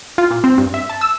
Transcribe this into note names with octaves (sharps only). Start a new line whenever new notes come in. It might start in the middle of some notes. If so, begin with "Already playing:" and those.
F4
A#2
C4
G2
E5
A5
E6